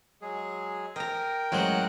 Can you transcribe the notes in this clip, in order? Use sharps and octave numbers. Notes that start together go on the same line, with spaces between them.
F#3 G#3 G#4
A#4 D#5 G5 A#5
A1 F#3 G#3 C5 F#5